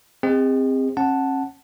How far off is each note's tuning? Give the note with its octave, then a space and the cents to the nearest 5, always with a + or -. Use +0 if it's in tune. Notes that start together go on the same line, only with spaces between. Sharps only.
C4 +0 G#4 -40 D#5 +0
C#4 -40 F#5 +0 A5 +0